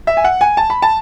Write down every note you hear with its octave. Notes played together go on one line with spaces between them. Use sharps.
E5
G#5
F#5
G#5
A5
B5
A5